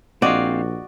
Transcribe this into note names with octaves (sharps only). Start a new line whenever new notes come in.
A#1 C4 F#4 D5 D#5 F5